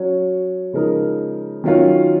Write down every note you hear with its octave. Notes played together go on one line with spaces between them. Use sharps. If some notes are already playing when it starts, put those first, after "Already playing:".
Already playing: F#3 C#4 F#4 C#5
C#3 F3 G#3 D#4 A#4
D#3 F#3 C#4 F4